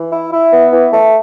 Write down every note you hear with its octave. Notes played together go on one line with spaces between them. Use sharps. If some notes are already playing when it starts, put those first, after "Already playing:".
Already playing: E3
E4
E4
B3
E3
A3